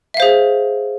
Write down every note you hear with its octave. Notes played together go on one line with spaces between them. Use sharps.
G#4 C5 E5 F5